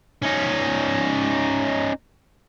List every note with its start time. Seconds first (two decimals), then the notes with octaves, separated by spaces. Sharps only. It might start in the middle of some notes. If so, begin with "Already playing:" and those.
0.23 C#4 D#4